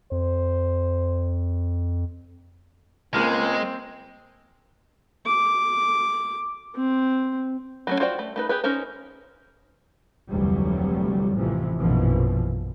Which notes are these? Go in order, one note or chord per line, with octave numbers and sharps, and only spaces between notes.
F2 C5
C#2 G#3 A#3 C4 F6
D6
C4
F#3 A3 C#4
F4 F#4 C5 D5 G5
A3
A3 D#4 B4
G4 G#4 B4
C#4 D#4 A#4 C5
F1 D2 E3 F#3 G3
A1 F2 C3 E3 F3
A#1 F#2 B2 E3 F3